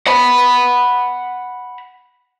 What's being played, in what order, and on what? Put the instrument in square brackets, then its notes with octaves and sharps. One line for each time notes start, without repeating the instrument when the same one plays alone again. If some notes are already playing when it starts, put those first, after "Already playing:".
[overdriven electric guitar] F#5 B5